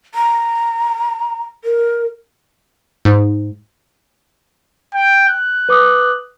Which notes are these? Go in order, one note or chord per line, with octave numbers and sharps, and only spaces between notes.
A#5
A#4
G#2
G5
F#6
B4 D6 D#6